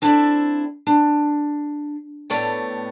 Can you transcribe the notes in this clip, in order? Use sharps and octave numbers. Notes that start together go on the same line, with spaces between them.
C4 D4 E4 A4 D5 E5
D4
A2 A3 B3 C#5 D5 G5